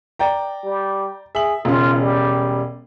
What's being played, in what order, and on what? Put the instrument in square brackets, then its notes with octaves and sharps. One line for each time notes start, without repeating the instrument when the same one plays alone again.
[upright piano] D5 G5 A#5
[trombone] G3
[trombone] G#4 [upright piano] E5 F#7
[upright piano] E1 C#3 C#4 [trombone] F4
[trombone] G3